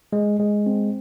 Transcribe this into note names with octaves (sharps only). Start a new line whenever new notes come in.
G#3
G#3
C4